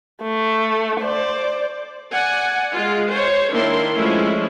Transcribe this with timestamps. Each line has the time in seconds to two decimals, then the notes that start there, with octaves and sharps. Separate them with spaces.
0.22 A3
1.01 C5 D5
2.12 D5 F#5 G#5
2.73 G#3 F4
3.11 C5 C#5
3.52 D#3 A#3 D4 E4 C6
3.94 F3 G#3 A3 C#4 E4